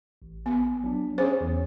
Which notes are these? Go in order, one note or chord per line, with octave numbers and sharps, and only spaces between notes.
A1
B3
F#3 D4
C#4 G#4 C5 C#5
E2